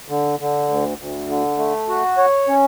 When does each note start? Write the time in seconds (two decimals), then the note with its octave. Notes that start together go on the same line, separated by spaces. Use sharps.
0.08 D3
0.39 D3
0.69 D2
0.98 D2
1.28 D3
1.58 A3
1.88 F#4
2.17 C#5
2.48 C#4